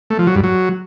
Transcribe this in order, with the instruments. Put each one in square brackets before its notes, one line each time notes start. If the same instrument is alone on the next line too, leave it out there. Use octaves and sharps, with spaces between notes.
[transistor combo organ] A3
F3
F#3
G2
F#3